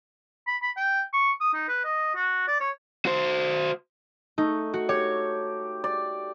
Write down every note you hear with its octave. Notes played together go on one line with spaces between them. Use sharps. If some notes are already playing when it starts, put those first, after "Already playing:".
B5
B5
G5
C#6
D#6
D#4
B4
D#5
F#4
D5
C#5
F#4 C5
A3 D#4
F#4
G4 C#5
D5